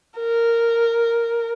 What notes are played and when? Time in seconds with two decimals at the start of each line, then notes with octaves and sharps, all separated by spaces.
0.19 A#4